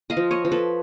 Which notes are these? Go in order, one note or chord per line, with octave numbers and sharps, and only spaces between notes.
D#5 F5
F3
C#5 D#5
F3
A4 B4